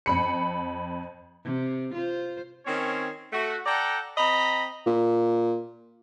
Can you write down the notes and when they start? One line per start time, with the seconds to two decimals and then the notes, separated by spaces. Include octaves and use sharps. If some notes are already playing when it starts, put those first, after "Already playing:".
0.06 F2 B5 C#7
1.44 C3
1.94 F4 C5
2.66 D#3 C4 C#4 C#5
3.32 A3 F#4
3.66 A4 D5 F#5 G5 A#5
4.18 C4 D#5 A#5 B5
4.86 A#2